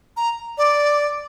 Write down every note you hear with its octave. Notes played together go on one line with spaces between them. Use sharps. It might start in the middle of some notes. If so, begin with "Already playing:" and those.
A#5
D5